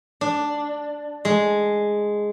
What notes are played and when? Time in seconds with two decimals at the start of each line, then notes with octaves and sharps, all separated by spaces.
0.21 D4
1.25 G#3